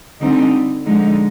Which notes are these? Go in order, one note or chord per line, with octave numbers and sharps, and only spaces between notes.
D3 G3 C4 D#4
D3 F3 G#3 D#4